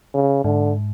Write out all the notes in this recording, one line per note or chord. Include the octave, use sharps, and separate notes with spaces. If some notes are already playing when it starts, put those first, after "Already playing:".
C#3
G#2 D3